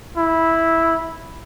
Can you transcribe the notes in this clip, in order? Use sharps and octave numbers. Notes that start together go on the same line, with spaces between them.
E4